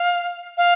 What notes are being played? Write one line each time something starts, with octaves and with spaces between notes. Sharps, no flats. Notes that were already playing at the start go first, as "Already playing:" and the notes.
Already playing: F5
F5